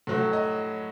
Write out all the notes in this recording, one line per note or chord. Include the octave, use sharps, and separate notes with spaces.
A2 F#3 A3
D#5